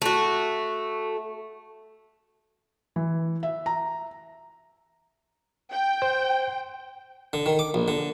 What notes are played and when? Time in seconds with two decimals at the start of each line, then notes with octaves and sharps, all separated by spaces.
0.02 A3 F#4
2.96 E3
3.43 E5
3.66 A#5
5.72 G5
6.02 C5 G6
7.33 D3
7.46 D#3
7.59 D6
7.74 A#1
7.88 D3